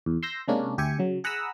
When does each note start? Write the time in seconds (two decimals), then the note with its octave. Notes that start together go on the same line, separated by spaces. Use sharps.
0.06 E2
0.23 C6 E6 G6 A#6
0.48 C3 G#3 A#3 C#4 D4
0.78 D2 G4 E5 G5 G#5 C#7
0.99 C#3 F#3
1.24 G#4 F#5 A#5 B5 D#6 E6